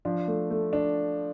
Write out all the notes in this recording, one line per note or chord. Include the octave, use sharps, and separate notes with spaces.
F3 D4
A3
A3
D4